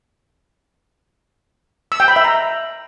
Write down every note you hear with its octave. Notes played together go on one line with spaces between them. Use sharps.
E6
G5
B5
E5
A#5